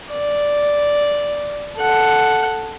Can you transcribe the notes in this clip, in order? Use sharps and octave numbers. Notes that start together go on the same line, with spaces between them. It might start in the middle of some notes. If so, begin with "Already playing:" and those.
D5
A4 F#5